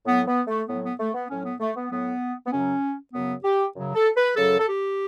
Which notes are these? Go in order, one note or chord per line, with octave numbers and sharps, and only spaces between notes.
A2 F#3 B3
B3
A3
A2 F#3 B3
B3
A3
B3
A2 F#3 C#4
B3
A3
B3
A2 F#3 B3
B3
F#2 C#3 F#3 C#4
F#2 C#3 F#3 B3
G4
F#2 C#3 F#3
A4
B4
F#2 C#3 F#3 A4
A4
G4